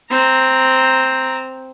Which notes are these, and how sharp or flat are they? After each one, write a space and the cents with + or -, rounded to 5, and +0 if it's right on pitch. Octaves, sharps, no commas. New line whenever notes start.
C4 +0 A#5 +0